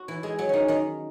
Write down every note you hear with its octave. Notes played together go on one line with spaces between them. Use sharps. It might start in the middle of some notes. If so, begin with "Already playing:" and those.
Already playing: F#4
E3 E4
G#3 G#4
F#3 F#4
D#3 C#4 D#4
D#3 D#4